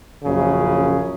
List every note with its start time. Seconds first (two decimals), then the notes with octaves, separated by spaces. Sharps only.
0.24 A#1 F#2 C#3